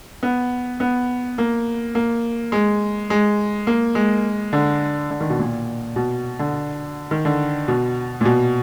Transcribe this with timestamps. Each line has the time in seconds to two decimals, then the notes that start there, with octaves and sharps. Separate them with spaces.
0.23 B3
0.80 B3
1.38 A#3
1.95 A#3
2.52 G#3
3.10 G#3
3.67 A#3
3.95 G#3
4.53 D3
5.10 D3
5.20 D#3
5.30 B2
5.39 A#2
5.96 B2
6.39 D3
7.11 D#3
7.25 D3
7.68 B2
8.21 A#2
8.25 B2